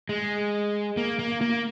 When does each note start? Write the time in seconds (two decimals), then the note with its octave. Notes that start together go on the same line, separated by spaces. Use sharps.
0.09 G#3
0.97 A#3
1.19 A#3
1.41 A#3